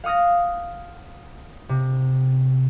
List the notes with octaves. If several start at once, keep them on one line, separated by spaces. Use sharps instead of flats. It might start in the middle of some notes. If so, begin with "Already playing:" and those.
F5 F#5 D#6 F6 A#6
C3